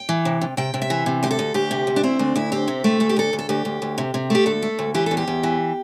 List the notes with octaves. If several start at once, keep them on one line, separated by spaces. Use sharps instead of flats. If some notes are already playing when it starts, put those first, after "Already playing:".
Already playing: G5
E3
C3
C3
C3 G5
C3
E5
E3
C3
D2 G4
A4
D2
D2 G4
C3
D2
D4
C4 E4
D2 D4
D2 E4
C4 G4
C3
A3
D2 A4
G4
D2 A4
D2
A4
D2 G4
D2
D2
C3
C3
A3 G4
D2 A4
A3
D2
E3 G4
E2 A4
G4
E2
E3